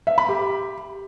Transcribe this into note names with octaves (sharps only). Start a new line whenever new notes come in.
E5
B5
G4